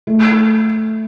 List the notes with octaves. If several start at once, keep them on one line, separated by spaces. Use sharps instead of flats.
A3